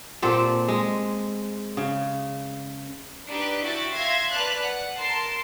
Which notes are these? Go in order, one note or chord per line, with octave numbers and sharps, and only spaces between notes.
A#2 C4 G4 A4
G#3
C#3
D4 D#4 G4 B4 F#6
E4 F#4 E5 G5 A6
E5 F5 C6 G#6 A#6
B4 D5 A5 F6 F#6
F#5
A#4 A5 C6 C7